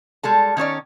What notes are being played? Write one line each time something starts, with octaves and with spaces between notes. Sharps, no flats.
G3 G#3 A4 A5
D#3 C#4 C#5 D5